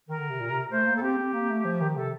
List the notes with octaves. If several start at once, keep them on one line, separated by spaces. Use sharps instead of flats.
D#3 A#4
D3
C3
A#2
C3
A3 C5
A#3
A4
C4 G4
C4
A#3
A3
F3
D#3
C3 A4